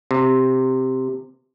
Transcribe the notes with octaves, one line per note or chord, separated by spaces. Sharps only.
C3